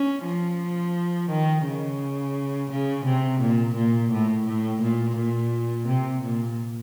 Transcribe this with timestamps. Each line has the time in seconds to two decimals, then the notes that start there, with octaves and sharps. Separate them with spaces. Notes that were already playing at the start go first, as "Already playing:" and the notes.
Already playing: C#4
0.24 F3
1.30 D#3
1.65 C#3
2.71 C#3
3.05 C3
3.41 A#2
3.76 A#2
4.12 A2
4.47 A2
4.82 A#2
5.17 A#2
5.88 C3
6.23 A#2